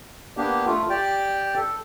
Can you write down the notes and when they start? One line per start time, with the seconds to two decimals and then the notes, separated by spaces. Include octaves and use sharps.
0.37 A#3 B3 D4 G4
0.66 A3 F4
0.90 G4 D5 G5
1.56 A4